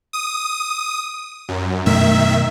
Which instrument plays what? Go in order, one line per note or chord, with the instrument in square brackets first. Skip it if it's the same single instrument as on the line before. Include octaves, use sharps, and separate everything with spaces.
[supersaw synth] D#6
F#2
[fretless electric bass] F#2 B2 A3 [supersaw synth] D#3 E5